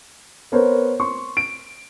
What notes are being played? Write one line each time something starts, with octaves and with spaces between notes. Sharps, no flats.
B3 A#4 C5 C#5
C6 C#6
D7